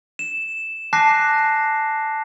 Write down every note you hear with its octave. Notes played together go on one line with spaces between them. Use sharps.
E7
G#5 A5 D6 F#6 A#6 C7